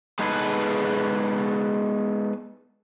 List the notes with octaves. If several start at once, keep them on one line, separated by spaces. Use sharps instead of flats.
G#3 B3 D#4 G#4 A4 B4